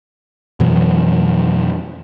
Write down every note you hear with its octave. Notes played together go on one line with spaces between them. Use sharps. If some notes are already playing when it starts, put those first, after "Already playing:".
F2 B2 E3 F#3